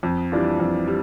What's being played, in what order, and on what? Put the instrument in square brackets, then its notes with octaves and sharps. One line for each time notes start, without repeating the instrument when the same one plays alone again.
[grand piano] F2
E3 G3 D4 F4
F2
G3